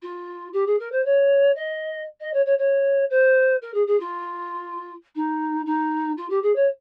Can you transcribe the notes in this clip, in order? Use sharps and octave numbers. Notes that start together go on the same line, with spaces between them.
F4
G4
G#4
A#4
C5
C#5
D#5
D#5
C#5
C#5
C#5
C5
A#4
G#4
G#4
F4
D#4
D#4
F4
G4
G#4
C#5